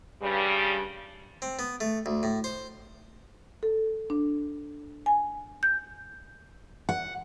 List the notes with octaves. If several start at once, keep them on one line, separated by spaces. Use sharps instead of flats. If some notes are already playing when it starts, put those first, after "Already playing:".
G2 C#3 G3
C4
B3
A3
D2
A2
C5
A4
D4
G#5
G6
F#5